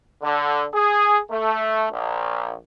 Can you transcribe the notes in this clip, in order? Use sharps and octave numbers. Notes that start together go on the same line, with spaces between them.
D3
G#4
A3
A#1